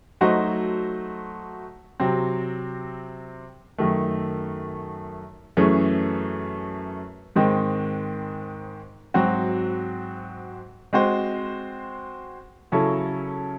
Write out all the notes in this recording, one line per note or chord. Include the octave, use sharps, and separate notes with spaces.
F#3 A3 D#4 F#4 C5
C3 F#3 C4
F#2 D#3 A3
F#2 E3 A3 C#4 G#4
G#2 D#3 G#3 C4
G#2 F#3 C4 F#4
G#3 C4 F#4 C5
C#3 F#3 C#4 E4 A4